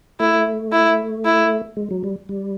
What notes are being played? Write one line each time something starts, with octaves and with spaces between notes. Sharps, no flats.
A3 E4
E4
E4
G#3
F#3
G3
G3